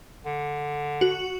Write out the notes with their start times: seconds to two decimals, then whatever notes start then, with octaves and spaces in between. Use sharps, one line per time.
0.26 D3
1.01 F#4